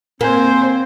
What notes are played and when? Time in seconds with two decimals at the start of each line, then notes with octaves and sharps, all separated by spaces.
0.21 A#3 C4 C5 G#5